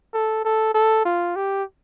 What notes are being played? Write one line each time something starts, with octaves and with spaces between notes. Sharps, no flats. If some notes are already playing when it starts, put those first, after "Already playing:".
A4
A4
A4
F4
G4